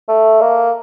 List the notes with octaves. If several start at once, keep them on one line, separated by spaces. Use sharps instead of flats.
A3
A#3